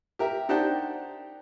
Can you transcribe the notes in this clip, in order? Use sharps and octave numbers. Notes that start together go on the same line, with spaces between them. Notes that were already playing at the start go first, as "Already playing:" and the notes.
G4 A#4 E5
D4 D#4 G4 C5 F#5 A5